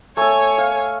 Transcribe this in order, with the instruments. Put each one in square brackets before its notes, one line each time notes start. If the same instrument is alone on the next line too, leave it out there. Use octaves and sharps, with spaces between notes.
[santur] A3 A4 [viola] C#5 G#5
[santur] F5